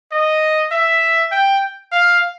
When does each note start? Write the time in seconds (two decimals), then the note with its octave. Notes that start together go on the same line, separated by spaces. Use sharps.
0.12 D#5
0.71 E5
1.32 G5
1.92 F5